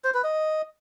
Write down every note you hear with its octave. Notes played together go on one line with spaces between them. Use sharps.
C5
B4
D#5